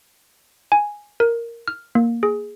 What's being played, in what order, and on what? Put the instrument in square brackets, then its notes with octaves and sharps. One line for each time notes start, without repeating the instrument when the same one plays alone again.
[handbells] G#5
A#4
F6
A#3
G#4